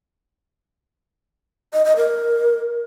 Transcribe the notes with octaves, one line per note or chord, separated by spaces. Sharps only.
D#5
D#5
A#4